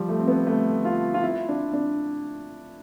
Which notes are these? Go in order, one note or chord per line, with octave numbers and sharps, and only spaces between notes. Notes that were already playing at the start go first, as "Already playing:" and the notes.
Already playing: F3 G3
A3
C4
B3
A3
F4
F4
E4
D4
D4